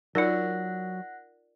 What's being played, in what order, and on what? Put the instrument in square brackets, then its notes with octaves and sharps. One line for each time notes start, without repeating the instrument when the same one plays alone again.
[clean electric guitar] F#3 [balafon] D#4 F4 [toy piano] A#4 D5 [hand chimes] F#5 F#6 A#6